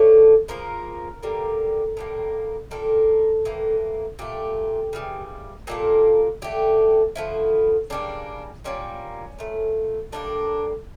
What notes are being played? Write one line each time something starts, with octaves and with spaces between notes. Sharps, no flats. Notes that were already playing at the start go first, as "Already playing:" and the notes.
Already playing: D3 A3 C#5
C#3 F3 A#3 A#4
D3 G3 A#3
A2 G3 A#3
A#2 G3 A#3 A4
A2 E3 A#3
A#2 A3 G4
C#3 E3 G3
A#2 G3 A#3 A4
D3 A3 G4
D3 F3 A3 E4
C#3 G3 A#3 D4
A#2 G3 A#3 C#4
A#2 A3
A2 G3 A#3 D4